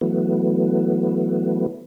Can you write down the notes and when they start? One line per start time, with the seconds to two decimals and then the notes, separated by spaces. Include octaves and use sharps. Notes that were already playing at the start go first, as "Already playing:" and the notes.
0.01 E3 F#3 A3 B3